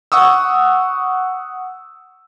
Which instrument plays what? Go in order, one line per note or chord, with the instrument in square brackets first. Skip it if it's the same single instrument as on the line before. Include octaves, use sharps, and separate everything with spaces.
[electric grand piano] F#5 C#6 D#6 E6